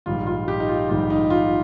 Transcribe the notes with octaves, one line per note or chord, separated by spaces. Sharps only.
A#1 G#2 D#3 G3 F4
F4
D#4 G4
D#4
F4
A#1 G#2 D#3 G3 F4
D#4
F4